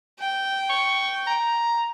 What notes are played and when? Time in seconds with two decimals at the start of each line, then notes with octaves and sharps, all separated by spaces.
0.20 G5
0.70 C#6
1.27 A#5